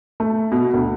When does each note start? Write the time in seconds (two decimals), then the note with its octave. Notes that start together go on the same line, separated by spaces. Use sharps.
0.20 A3
0.52 B2
0.74 D2